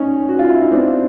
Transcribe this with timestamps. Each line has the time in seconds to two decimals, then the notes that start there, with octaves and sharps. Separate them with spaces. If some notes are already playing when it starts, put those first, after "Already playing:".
Already playing: C#4 D#4
0.29 F#4
0.39 F4
0.50 E4
0.62 D#4
0.71 C4 D4